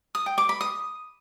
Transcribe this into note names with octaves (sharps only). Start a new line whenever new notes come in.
D#6
G5
D6
B5
D#6